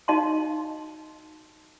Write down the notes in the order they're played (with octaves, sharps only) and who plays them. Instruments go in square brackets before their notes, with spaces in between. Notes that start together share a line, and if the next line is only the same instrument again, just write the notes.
[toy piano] D#4 F#4 D#5 F5 A5 C6